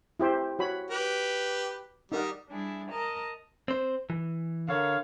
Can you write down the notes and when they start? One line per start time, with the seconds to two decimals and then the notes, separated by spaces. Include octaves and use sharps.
0.20 E4 G4 C5
0.59 F#4 C#5 B5
0.91 G4 B4
2.12 G3 D#4 A#4 F#5
2.49 G3 D4 E4 G#4
2.89 A#4 D#5 A5 A#5
3.68 C4 C5
4.10 E3
4.69 D3 A#4 C#5 F5